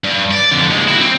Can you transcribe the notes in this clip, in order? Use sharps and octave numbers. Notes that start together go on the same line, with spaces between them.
G2
D5
F2 D3
D#2 G#3
E4 F#4
C4